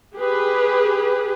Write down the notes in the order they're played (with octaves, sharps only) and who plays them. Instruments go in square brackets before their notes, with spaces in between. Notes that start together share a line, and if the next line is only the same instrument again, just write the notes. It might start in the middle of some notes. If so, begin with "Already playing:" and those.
[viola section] G4 G#4 B4